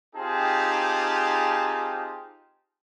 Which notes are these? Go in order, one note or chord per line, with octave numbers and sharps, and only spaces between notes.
C4 D#4 F4 G4 G#4 A5